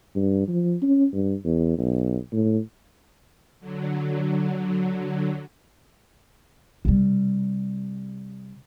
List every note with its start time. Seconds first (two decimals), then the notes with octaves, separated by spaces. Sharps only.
0.16 G2
0.48 F3
0.82 C#4
1.13 G2
1.45 E2
1.78 B1
2.33 A2
3.60 D3 F#3
6.85 C3 G3